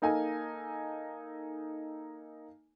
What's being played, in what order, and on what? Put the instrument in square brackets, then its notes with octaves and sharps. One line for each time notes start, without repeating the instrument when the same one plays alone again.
[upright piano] A#3 D#4 A4 G#5